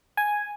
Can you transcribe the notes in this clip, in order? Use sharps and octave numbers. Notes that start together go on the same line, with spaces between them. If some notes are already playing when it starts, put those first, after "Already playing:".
G#5